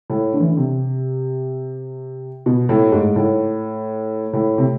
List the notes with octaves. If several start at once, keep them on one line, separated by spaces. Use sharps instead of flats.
A2
D3
E3
D3
C3
B2
A2
G#2
A2
A2
C3